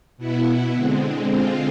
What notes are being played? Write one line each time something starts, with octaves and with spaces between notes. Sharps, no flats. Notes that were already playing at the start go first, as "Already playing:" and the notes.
B2 B3 E4
D3 G#3 C4
D3 G#3 C4 F4